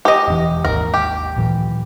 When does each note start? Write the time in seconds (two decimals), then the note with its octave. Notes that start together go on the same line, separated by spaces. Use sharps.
0.05 G4 D#5
0.28 E1 A#2 E3
0.65 G#1 D#2 A#4
0.94 G4
1.37 D1 A#2 E3